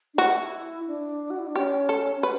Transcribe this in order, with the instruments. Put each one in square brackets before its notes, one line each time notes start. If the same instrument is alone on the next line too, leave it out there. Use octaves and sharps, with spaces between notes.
[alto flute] D4
[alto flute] E4 [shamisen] F#4
[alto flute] D4
F#4
E4
D4
[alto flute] C#4 [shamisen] G4
[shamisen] A4
[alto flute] C#4
[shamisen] B4